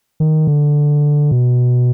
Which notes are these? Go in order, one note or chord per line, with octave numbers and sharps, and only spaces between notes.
D#3
D3
B2